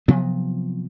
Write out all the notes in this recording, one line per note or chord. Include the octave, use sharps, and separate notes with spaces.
C3 F3 F#3 B3